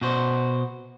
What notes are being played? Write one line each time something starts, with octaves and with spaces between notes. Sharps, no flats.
B2 F#4 C5